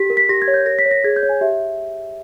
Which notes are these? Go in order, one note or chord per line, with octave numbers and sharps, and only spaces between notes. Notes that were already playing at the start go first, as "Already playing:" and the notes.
Already playing: G4 B6
A#4
B6
G4 A#6
G#6
C#5
G6
A#4 A#6
B6
C#5
A#6
G#4 G#6
G6
C#5
G#5
G4 E5